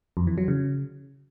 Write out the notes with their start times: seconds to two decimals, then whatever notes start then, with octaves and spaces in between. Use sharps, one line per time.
0.17 F2
0.27 E3
0.38 F#3
0.48 C#3